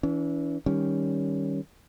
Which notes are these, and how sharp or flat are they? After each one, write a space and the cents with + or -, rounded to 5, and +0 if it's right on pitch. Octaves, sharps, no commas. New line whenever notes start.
E3 -10 C#4 +40
D#3 +0 G3 +0 C#4 +0